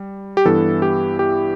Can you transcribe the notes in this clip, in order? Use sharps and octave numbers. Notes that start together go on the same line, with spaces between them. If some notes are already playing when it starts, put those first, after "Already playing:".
Already playing: G3
G4
G2 E3 B3 E4 A4
G4
G4